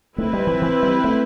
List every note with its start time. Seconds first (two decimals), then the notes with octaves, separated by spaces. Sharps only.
0.18 A3 C4 E4 B4
0.33 G3
0.47 E3
0.62 E3
0.83 G3
1.04 A3